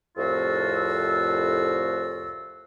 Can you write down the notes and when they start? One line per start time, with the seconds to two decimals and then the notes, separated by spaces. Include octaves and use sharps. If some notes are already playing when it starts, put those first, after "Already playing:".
0.17 C2 F2 A2 F4 F#4 E6